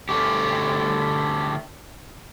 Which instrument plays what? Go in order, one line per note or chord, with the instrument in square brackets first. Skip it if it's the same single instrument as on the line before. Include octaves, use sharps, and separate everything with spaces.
[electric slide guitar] D3 A3 G4